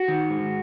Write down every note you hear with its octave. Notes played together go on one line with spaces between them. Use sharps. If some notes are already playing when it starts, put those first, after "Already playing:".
Already playing: F#4
D#3
G#2